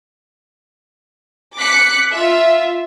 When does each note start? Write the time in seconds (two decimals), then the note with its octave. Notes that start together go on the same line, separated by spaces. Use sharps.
1.57 D6 F#6 B6 C#7
2.12 F4 E5